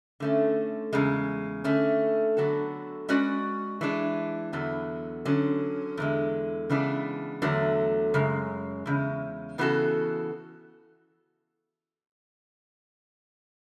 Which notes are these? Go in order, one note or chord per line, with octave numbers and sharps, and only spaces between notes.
D3 A3 C#4
E2 C#3 G#3
D3 A3 C#4
D3 F#3 B3 F#4 A4
G#3 C#4 F#4 B4 D5
E3 G#3 D4
E2 D3 F#3 B3
D3 F#3 C#4
E2 D3 G#3
C#3 E3 G#3 B3 D4
E2 D3 F#3 A3
F#2 C#3 G#3
E2 C#3 G#3
C#3 E3 B3 F#4 A4